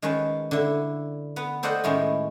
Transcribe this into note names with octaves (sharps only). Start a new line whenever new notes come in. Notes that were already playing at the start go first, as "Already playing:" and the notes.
D#3 G#3 C#4 B4 A5
D3 E4
B3 B4
A4 C5 D5 D#5 F#5 G5
A2 D#3 G#3 C#4 E4